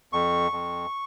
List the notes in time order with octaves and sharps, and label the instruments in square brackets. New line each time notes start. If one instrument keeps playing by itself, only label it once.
[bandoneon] F2 C#6
F2